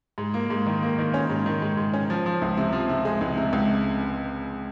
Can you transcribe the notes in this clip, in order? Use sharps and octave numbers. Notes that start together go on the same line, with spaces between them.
G#2
A#3
G#2
D#3
A#3
D#3
C#4
G#2
D#3
G#2
G#2
C#4
F3
F3
C#2
C3
F3
C3
G#3
C#2
C3
C#2